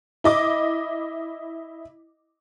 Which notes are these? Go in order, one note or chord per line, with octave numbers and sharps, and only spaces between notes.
E4 D#5 D6